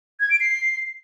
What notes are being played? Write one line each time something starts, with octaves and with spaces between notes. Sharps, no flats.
G#6
D7
C7